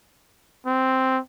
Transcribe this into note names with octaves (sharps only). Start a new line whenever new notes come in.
C4